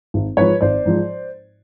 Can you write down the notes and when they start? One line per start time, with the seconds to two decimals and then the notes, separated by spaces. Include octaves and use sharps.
0.14 G#1
0.37 G#2 F3 B4 C#5
0.61 G#1 C5 D5
0.85 G#2 F3